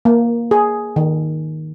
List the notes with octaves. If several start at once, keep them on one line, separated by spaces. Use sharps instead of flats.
A#3
G#4
D#3